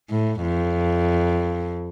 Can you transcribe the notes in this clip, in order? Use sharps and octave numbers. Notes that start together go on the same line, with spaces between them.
A2
F2